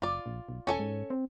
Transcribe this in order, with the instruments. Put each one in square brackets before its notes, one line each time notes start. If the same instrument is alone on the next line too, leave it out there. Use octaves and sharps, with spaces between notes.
[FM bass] F#1 [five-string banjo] F4 D5
[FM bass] A#1
B1
[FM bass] E1 [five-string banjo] C#4 A4 G#5
[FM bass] G#2
C4